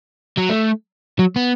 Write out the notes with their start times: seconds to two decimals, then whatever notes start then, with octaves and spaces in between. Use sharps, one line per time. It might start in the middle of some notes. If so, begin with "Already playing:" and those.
0.37 F#3
0.49 A3
1.19 F#3
1.36 B3